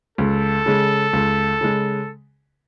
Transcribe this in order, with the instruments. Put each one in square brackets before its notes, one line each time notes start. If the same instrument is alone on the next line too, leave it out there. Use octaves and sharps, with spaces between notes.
[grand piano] C#2 [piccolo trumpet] A4
[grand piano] C#3 G#3
C#2
C#3 G#3